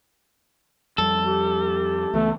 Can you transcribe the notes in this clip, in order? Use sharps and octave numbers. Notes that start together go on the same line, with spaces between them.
F2 G3 A4
G4
C#2 E3 A3 B3